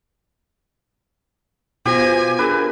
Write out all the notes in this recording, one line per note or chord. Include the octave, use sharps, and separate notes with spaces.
B2 B3 F4 G4 C5 G#5 A#6
D4 G#4 A#4 B4